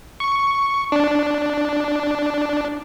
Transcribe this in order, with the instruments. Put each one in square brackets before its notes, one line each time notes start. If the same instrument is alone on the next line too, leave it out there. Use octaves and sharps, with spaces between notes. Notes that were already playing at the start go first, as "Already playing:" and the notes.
[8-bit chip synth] C#6
D4